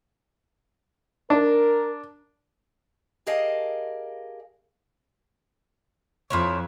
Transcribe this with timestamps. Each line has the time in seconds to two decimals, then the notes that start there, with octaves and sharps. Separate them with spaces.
1.30 D4 A#4
3.27 G4 G#4 A#4 D#5 F5 A5
6.30 F2 F3 E4 C#5